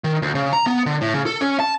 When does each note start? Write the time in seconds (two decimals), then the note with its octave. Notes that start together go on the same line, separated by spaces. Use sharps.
0.04 D#3
0.22 D2
0.35 C#3
0.53 A#5
0.67 B3
0.86 D3
1.01 A2
1.14 C#3
1.26 A4
1.41 C#4
1.60 A5